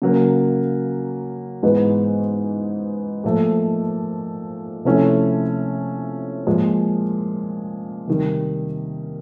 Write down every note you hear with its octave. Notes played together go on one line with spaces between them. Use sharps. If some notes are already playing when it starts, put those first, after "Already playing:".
C#3 F#3 A#3
G#2 E3 G#3 B3 D#4
A#2 F3 A3
C3 F3 A3 C#4 E4
A#2 F3 G#3
C3 D#3 G3